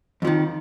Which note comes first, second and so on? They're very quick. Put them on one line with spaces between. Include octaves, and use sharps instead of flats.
F2 F3 D#3